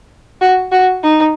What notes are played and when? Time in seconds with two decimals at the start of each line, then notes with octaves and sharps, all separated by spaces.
0.41 F#4
0.72 F#4
1.03 D#4